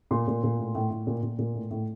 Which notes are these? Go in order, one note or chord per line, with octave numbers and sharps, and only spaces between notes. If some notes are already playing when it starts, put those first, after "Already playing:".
A#2 C6
A#2
A#2
A2
A2
A2
A#2
A#2
A#2
A2
A2